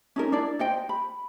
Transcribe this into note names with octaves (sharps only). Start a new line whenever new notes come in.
C#4 D#4 A#4
D4 E4 D5
C5 D#5 G5
B5